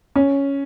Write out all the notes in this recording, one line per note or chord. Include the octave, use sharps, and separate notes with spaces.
C#4